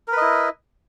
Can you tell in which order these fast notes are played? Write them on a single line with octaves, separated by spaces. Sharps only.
A#4 B4 D#5 E4